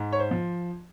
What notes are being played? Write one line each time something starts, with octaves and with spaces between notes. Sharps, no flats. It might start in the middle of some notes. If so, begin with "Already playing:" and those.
Already playing: G#2
C#5
C5
F3